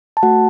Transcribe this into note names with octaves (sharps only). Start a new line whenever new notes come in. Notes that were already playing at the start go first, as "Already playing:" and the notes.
A5
A3 F#4 F#5